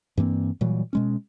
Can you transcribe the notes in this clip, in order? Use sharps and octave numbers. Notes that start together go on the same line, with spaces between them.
G2 E3 A#3 C4
A#2 E3 F#3 G3
B2 G#3 C#4